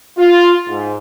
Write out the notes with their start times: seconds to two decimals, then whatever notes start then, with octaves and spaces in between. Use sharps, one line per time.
0.18 F4
0.68 G#2